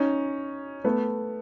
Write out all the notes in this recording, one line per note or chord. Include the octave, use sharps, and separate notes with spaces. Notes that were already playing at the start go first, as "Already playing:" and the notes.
Already playing: C#4 D#4
A3 B3